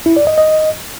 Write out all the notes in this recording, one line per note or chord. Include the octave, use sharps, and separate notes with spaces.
E4
D5
D#5
D#5